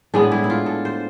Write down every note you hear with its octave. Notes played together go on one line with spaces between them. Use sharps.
A2 G#3 B3 D4
E4
E4
F4
A4
C5